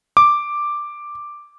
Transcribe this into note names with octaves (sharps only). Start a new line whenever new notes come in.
D6